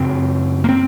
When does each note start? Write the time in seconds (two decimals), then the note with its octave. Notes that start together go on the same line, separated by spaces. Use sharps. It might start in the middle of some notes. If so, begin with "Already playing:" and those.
Already playing: F#2 C#3 C4
0.64 A#3
0.69 C4